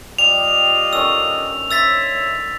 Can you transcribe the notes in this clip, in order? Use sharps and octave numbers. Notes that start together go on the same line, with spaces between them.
G3 F4 G4 D#5 F7
D3 D#3 C#4 E6
C5 C#5 E5 E6 A6 B6